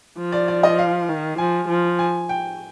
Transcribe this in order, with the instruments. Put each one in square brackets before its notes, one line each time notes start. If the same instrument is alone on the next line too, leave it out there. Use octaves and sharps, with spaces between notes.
[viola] F3
[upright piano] D5
D5
D#5
F5
[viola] D#3
[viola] F3 [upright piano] G#5
[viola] F3
[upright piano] G#5
G5